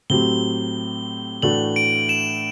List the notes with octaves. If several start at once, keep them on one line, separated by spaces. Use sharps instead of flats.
A2 F#3 C4 G4 G7
A2 E3 A3 D4 F#4 F#7
D7
E7